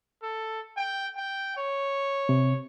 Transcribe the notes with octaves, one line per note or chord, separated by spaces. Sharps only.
A4
G5
G5
C#5
C3